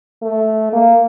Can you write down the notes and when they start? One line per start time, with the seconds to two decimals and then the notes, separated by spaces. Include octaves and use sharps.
0.22 A3
0.72 A#3